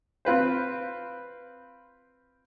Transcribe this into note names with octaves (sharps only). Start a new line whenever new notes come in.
C4 F4 B4 C5